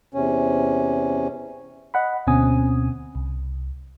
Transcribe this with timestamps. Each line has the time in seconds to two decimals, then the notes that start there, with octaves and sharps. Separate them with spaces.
0.14 E2 C3 C#4
1.94 D#5 F#5 B5
2.27 D2 B2 C4 C#4 G#5 D#6
3.15 C2